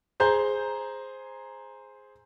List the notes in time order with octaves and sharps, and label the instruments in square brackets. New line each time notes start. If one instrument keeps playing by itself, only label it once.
[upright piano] G#4 C5 A#5 G6